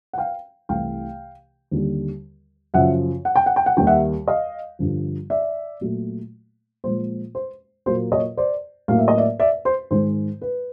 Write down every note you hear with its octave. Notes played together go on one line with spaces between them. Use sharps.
F#5
F5 G5
C2 C3 E3 A3 F5 G5
D#2 D3 G3
F#2 C#3 F3 E5 F#5
F#5
G5
F#5
G5
F#5
D#2 D#3 G3 G5
E5 F#5
D#5 F5
G2 D3 F3
D5 E5
A#2 F#3 A3
A#2 F3 G#3 C5
C5
A#2 F#3 A#3 C5
C#5 D#5
C5 D5
A2 F#3 A#3 F5
E5
D#5
D5 E5
D5 E5
C5
G#2 D#3 G#3 C5
B4